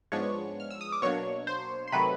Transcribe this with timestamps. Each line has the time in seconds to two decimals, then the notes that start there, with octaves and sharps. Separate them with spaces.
0.12 G#2 F3 G#3 B3 D4 C#5 C#6
0.60 F6
0.71 E6
0.81 D#6
0.92 D6
1.02 B2 F#3 A#3 D4 C#5 C#6
1.47 C5 C6
1.88 C6
1.92 C3 D#3 F#3 A3 B4 B5